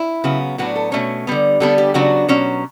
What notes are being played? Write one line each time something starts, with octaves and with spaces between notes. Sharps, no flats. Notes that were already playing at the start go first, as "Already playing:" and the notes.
Already playing: E4
C#3 F#3 B3
A2 F#3 B3 D4 F#4
A4
B2 A3 C#4 C#5
D3 G3 B3
D3 G3 B3 D4 A4
G4
C#3 F#3 B3 D4 F#4
B2 F#3 C#4